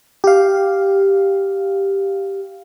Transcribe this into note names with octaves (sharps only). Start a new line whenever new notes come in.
G4 F5